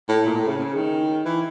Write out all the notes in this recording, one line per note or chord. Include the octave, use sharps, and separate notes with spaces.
A2
A#2
A2
C#3
C#3
D#3
E3